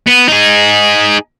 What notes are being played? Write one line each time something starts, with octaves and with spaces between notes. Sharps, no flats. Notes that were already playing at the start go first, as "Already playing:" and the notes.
B3
D#4 G#4